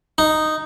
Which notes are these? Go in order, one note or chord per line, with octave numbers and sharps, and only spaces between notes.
D#4